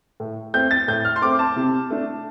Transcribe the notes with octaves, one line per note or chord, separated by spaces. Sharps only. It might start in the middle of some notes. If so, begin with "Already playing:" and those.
A2
A3 C4 G6
A6
A2 G6
F6
C6
A3 C4 D6
A5
C3
A3 D4